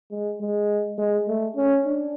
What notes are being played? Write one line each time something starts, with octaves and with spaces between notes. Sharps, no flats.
G#3
G#3
G#3
A3
C#4
D4